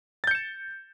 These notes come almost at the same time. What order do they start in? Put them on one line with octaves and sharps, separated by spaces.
A6 G6 C#7 E7